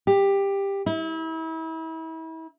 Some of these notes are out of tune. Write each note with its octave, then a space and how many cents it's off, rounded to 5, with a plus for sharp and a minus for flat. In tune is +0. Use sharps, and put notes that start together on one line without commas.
G4 +15
E4 -35